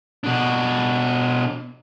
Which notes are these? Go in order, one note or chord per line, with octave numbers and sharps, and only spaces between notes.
B2 D4